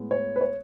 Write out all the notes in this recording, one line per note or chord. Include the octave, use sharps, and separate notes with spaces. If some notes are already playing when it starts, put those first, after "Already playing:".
Already playing: A2 G#3 B3
C#5
B4
C#5